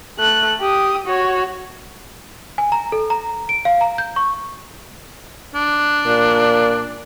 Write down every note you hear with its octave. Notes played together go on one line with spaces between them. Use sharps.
A3 F#6
G4 D#6
F#4 C#5
G#5
A#5
A4
A#5
D7
F5
A#5
G6
C#6
D4
A#2